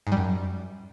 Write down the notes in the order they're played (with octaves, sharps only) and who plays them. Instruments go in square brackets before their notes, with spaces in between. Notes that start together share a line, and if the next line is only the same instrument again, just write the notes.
[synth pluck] G#2
G3
F#2